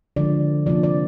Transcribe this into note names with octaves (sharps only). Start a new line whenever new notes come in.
D3 F3 G#3 D5
C3 F3 A#3 D4 D5
D5